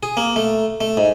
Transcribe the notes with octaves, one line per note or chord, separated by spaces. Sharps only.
G#4
A#3
A3
A3
G#2